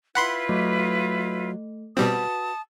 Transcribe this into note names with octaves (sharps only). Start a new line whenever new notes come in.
E4 F4 B4 F#5 B5 C6
F#3 A3
B2 G3 C4 F#4 B4 A5 D#6